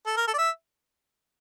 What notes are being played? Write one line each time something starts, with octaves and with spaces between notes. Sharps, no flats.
A4
A#4
A4
D5
E5